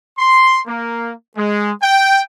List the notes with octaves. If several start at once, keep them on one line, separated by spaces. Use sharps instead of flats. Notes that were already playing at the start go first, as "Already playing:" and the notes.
C6
A#3
G#3
G5